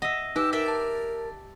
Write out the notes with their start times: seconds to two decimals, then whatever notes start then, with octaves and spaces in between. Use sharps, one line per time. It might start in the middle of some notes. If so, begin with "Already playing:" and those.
0.02 D#5 E5 F#5
0.36 D#4 G4 B4 E6
0.53 A#4 D5 E5 G5
0.66 A5 A6